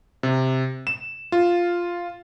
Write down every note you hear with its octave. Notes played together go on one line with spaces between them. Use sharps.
C3
E7
F4